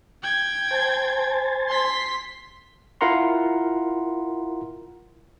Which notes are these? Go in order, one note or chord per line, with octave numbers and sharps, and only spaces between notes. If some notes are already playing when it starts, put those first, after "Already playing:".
G5 G#6
C5 G#5 A5
C6 B6
E4 F4 A#4 F#5 A#5 C6